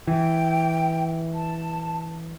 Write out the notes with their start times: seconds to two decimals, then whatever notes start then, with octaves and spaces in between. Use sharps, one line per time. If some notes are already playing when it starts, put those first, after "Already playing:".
0.07 E3 G5
1.35 A5